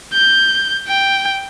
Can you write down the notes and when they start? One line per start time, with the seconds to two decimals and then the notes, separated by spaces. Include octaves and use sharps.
0.13 G6
0.88 G5